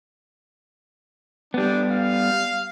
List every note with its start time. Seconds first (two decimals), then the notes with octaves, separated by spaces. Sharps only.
1.54 G3 B3 D4
1.92 F5